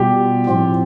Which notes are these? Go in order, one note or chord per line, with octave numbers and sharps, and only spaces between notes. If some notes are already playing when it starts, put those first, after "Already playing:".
Already playing: B2 G3 B3 F4 G4
A2 F3 C4 F4